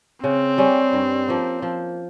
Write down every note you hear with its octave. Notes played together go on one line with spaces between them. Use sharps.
C#3 C4
G3 C#4
G2
F3 A#3
F3